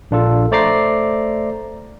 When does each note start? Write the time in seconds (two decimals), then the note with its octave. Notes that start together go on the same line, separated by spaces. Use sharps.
0.11 A#1 D4 F4 A4
0.52 A3 C5 D5 A#5 D6 C7